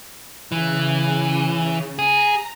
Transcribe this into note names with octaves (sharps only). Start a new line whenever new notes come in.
C#3 E3
G#4 A#5